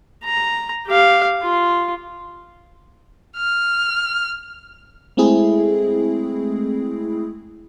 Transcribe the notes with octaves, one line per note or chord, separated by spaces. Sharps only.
A#5
G4 F5
F4
F6
G#3 A3 C4 E4 G#4